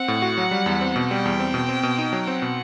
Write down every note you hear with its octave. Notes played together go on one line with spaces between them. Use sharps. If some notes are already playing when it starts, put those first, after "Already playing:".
Already playing: C4 F#5
A2
F#4
F#3
G3
E2
C4
B2
G3 G5
E2
C4
B2
C4
B2
D#4
F#3
C4 F#5
B2